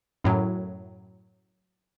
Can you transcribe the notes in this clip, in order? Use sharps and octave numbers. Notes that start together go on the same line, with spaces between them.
F#2 A2 F#3